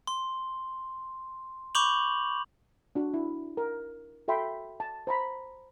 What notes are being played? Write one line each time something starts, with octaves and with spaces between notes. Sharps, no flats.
C6
B5 C#6 D6 G6 F7 F#7
D4 F#4
E4
A#4
F#4 A4 E5 G5 B5 C6
A5
C5 A#5 B5